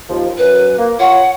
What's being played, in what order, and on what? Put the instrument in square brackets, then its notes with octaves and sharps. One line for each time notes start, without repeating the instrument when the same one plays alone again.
[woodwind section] D#2 F3
[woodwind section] F#2 [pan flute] B4
[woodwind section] A#3
[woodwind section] F4 C#5 [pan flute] F#5